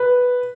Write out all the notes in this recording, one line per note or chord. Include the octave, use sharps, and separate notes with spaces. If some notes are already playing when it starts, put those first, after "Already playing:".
Already playing: B4